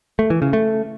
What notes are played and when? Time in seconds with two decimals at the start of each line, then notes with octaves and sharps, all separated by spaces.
0.19 A3
0.30 E3
0.42 C#3
0.53 A3